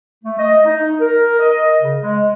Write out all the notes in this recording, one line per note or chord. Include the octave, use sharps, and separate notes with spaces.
A3
D#5
D#4
A#4
D#5
C#3
G#3